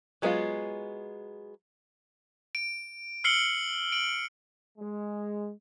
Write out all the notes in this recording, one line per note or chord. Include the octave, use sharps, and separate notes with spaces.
F#3 G#3 B3 D#4 F4
D7
E6 F6 C7 C#7 F#7 G7
D7 F#7
G#3